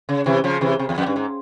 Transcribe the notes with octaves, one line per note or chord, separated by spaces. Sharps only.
C#3
C3 E3
C#3 F3
C3 E3
C3
E2
F2
G2
G#2